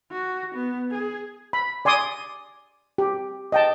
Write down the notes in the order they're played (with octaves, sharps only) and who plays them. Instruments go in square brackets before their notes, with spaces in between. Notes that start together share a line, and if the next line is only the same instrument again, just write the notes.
[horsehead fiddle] F#4
B3
G#4
[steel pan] B5
D5 G#5 C6 D6 D#6
G4
D#5 G5 A5